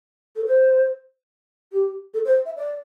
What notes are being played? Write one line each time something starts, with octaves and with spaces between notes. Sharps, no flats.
A4
C5
G4
A4
C5
E5
D5